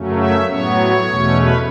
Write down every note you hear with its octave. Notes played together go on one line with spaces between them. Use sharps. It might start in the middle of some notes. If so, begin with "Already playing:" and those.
Already playing: F#2 C#3 F#3 A3 C#4
E5
A2 F#3 B3 C#5
E2 B2 A3 C#4
B4